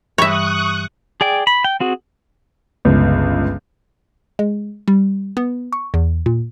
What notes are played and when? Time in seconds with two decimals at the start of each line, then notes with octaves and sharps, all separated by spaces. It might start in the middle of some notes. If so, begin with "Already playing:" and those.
0.18 G2 E3 G3 C#5 E5 C#6 D#6 F#6
1.21 G#4 D5 G5
1.47 B5
1.64 G5
1.80 C4 F#4 G#4
2.85 G1 C#2
4.39 G#3
4.88 G3
5.37 B3
5.73 C#6
5.94 E2
6.26 A#2